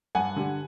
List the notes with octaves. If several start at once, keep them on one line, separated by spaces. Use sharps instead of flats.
G2 F#5 G#5
D3 G3